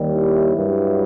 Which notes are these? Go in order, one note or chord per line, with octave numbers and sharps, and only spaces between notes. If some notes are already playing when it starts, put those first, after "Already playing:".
Already playing: D#2 D#3 G3
E4
G2 F#3